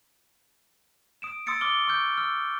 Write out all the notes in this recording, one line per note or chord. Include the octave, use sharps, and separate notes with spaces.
D#6 D7 E7
C6 D#6 E6 A6 C#7 D7
D6 D#6 F6 G7
C#6 E6 F6 G6 D7
E6 F6